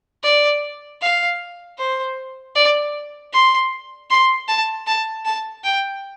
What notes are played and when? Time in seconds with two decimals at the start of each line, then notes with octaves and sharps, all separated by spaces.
0.23 D5
1.02 F5
1.78 C5
2.55 D5
3.33 C6
4.10 C6
4.48 A5
4.87 A5
5.25 A5
5.64 G5